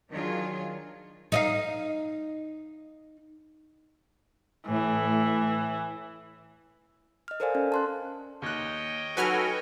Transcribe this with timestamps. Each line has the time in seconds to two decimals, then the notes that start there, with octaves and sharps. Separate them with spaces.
0.11 D#3 F#3 D4 F4 G#4
1.32 D#4 D#5 F5
4.67 A2 E3
7.28 D#5 F6
7.40 A4 A#4 C5 D5 F5 G#5
7.55 C#4 A4
7.72 A5 C6 F#6
8.42 D#2 C#5 D#5 G5 F#6
9.17 F#3 D#4 F#4 A4 B4 F#5 G#5 F6